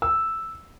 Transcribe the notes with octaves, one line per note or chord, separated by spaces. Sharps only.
E6